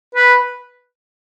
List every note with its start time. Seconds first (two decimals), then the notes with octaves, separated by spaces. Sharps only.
0.15 B4